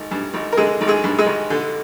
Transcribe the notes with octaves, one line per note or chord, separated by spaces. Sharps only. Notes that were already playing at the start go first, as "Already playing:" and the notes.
Already playing: G#1
G2
G#1
A#4
D3 G#3 G#4
G#1
G#3 G#4
G2
G#3 G#4
G#1
D3